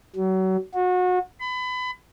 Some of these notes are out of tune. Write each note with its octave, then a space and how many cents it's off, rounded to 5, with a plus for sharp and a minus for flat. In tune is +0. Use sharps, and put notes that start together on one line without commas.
F#3 +30
F#4 -30
B5 +30